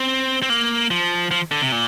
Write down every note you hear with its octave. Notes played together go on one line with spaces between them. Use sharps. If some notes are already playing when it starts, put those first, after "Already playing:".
Already playing: C4
C4
A#3
F3
F3
D3
C3
A#2